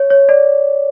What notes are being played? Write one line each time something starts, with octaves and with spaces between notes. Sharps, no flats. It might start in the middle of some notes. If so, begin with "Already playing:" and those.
Already playing: C#5
C#5
D5